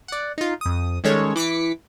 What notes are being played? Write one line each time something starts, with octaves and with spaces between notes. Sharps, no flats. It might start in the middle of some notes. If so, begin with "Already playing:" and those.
D5 F#5
D#4 F4
F2 D#6
D#3 G3 G#3 C#4 A4 C#5
E3 D6 B6 C#7